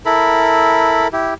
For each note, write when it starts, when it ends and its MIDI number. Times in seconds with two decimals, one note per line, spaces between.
0.06 1.08 64
0.06 1.08 69
0.06 1.08 70
0.06 1.08 83
1.13 1.34 64
1.13 1.34 67